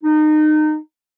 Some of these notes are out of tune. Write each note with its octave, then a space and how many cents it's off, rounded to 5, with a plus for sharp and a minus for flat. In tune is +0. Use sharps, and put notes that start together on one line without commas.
D#4 -25